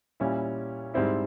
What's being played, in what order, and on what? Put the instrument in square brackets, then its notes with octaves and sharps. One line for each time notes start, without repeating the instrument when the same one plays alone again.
[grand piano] A#2 G3 C#4 E4
G#2 G3 C4 E4